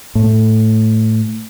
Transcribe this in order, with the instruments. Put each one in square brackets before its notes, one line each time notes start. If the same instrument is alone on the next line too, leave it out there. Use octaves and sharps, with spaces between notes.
[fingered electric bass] A2